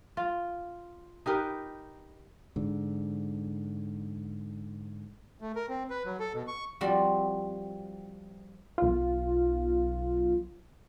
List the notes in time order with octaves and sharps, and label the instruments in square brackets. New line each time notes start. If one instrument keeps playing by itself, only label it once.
[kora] F4
D#4 G4 A#4 B4
[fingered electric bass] G#2 D3
[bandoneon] A3
A#4
C4
B4
F#3
A4
B2
C#6
[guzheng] F3 G3 C4 F#4
[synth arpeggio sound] B1 F4